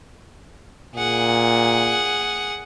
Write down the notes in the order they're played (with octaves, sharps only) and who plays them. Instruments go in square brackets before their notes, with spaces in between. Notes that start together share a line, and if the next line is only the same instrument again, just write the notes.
[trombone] A#2 [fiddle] G#4 F#5